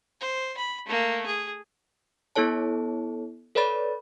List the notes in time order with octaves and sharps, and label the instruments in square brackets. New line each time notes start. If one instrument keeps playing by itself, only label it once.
[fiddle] C5
B5
A3 A#3
G#4
[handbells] B3 E4 A4 C#5 A5
A4 B4 C#5 D5 B5 A6